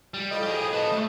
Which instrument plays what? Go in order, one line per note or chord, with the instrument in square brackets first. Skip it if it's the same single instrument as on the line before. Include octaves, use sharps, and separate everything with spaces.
[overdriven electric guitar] G3
[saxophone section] A2 F3 D#5
[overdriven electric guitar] G4 G#4
B4 A5
A3